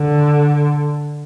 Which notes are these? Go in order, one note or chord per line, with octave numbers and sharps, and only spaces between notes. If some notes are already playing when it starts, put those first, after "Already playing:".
Already playing: D3